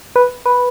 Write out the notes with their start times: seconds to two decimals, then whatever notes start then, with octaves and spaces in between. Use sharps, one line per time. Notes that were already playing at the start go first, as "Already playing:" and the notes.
0.16 B4
0.46 B4